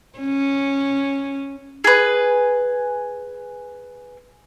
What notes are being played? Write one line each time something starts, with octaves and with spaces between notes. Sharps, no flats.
C#4
G#4 B4